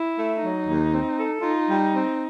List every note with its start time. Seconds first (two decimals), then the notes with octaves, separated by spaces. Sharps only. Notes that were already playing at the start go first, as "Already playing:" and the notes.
Already playing: E4
0.16 A3
0.41 F#3 D#4
0.66 D#2
0.91 C4
1.17 A4
1.41 D#4 F4
1.67 G3
1.91 C4